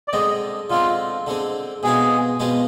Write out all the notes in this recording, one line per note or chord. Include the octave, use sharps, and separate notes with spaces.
D5
D3 G#3 C4 D#5
D3 G#3 C4 F4
D3 G#3 C4
B2 G#3 C4 F4 G#4
B2 G#3 C4 F4